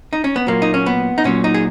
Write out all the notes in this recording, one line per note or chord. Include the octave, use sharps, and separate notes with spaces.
D#4
C#4
B3
A#2 F#3 A#3
D#4
C#4
B3
D#4
A#2 F#3 C#4
D#4
G#4